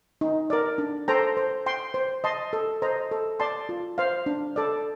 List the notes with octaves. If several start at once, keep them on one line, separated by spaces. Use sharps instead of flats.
D#4
A#4 D5
D4
A4 C5 G5 A#5
C5
G5 C6
C5
D#5 A5 C6
A4
C5 D#5 A#5
A4
D5 A5 C6
F4
C5 F5
D4
A4 D5